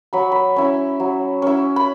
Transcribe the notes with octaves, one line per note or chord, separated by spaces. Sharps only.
F#3 B5
B5
C#4 E4
F#3
C#4 E4
B5